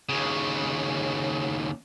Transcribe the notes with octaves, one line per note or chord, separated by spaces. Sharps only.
D#2 C#3